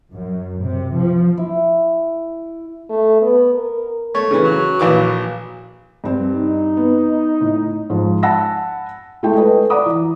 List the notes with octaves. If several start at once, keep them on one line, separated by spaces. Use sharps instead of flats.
F#2
C3
F3
E4
A3
B3
A#4
A3 C#5
C#3 E3
F#3
A#1 E3 D6
G2 C4
D#4
B3
A2
G#2 F3
F#5 G#5 A5 B5 E6 A#6
G#3 A3 E4 A4 G5
A4 B4 D#5 G#5
D5 F#5 A#5 B5 D6 D#6
E3